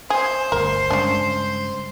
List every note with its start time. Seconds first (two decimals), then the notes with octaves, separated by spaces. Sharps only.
0.10 G#4 C5
0.52 G1 D2 A#4
0.90 G2 C#3 G#3 C#4 D4